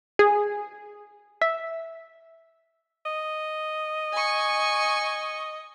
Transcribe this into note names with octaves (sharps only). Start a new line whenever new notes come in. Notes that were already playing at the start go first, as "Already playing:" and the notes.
G#4
E5
D#5
G#5 C#6